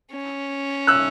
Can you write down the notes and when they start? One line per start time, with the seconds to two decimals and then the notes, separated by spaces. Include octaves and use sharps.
0.11 C#4
0.87 E6 F#6